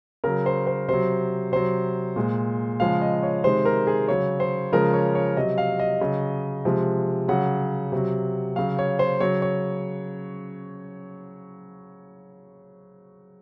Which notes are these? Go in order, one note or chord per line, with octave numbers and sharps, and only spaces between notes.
C#3 F#3 A#4
C5
C5
C3 F#3 C5
C3 F#3 C5
A#2 G#3
C#3 F3 G#3 F5
D#5
C#5
C3 D#3 G#3 C5
A#4
G#4
C#3 F#3 C#5
C5
C#3 F3 G#3 A#4
C#5
C#5
C3 F#3 D#5
F5
D#5
C#3 F#3
C3 F3 G#3
C#3 F#3 F#5
C3 F#3
C#3 F#3 F5
C#5
C5
C#3 F#3 C#5
C#5